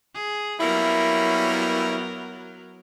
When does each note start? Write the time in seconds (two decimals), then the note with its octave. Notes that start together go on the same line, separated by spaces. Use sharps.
0.14 G#4
0.60 F#3 G3 A#3 B3 C#4 E4 A#4